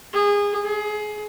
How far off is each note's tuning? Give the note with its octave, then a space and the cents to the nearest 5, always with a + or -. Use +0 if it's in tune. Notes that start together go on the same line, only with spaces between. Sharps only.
G#4 -25
G#4 +25